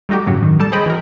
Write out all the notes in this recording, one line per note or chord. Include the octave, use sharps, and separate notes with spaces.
G3 A3 D#4 F#4 G4
F#2 A2 C#3 F#3
D#3
G3 A4 A5
G#4 C5 C#5 D#5 G5 B5
E3 F#3 A#4